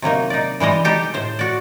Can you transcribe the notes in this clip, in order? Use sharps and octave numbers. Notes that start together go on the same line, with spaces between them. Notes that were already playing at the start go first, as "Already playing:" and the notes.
C3 F#3 A#3 D#4
D#4 D5
E3 G3 G#3 D#5
D#4 G4 A4
A2 C5
F#4 D5